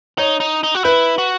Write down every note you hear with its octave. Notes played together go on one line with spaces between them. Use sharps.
D#4 C#5
D#4
D#4
F#4
E4 B4
F#4